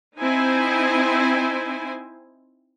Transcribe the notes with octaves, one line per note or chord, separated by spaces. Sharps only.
C4 D#4 E4 C5 G#5